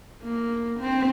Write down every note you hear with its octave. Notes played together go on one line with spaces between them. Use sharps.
A#3
C4